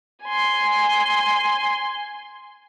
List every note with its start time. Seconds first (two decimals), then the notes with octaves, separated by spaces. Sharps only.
0.25 G#5 C6